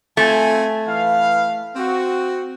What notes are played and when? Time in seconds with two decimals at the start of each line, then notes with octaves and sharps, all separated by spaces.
0.17 A3 C4 F4 G#5
0.87 E3 B4 F5
1.76 C4 F#4